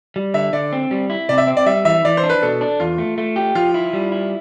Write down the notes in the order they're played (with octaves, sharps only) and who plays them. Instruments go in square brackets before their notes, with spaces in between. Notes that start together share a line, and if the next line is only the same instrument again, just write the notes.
[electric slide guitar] G3
[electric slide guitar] D3 [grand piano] E5
[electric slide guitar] D3 [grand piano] D5
[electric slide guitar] C4
G3
E4
[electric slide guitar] C3 [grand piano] D5
[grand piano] E5
[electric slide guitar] C4
[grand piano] D5
[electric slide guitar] G3 [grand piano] E5
[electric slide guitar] E3 [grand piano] E5
[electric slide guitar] E3 [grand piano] D5
[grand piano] C5
[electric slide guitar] D4
[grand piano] B4
[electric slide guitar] B2 [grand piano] A4
[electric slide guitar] D4
[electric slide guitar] E2 [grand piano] F4
[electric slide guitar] A3
A3
G4
[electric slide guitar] F3 [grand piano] F4
[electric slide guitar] E4
G3
E4